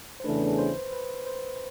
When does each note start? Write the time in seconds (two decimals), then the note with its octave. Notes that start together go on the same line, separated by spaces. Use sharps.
0.20 C5
0.25 E2 C#3 E3 A3 D4 B4
0.59 C5
0.93 B4
1.26 C5